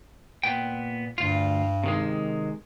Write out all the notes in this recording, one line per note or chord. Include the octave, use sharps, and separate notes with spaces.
A#2 B3 G5
D2 G2 F4
C3 D#3 G#3